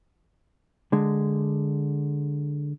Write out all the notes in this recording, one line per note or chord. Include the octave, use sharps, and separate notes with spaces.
D3 G#3